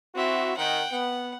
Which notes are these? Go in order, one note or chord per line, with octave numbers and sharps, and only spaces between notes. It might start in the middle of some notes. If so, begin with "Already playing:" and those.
C4 E4 F#4 E5
D#3 F#5 G5
B3 F#5